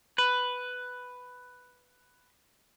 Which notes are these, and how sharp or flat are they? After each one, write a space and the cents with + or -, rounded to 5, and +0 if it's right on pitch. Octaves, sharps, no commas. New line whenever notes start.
B4 +5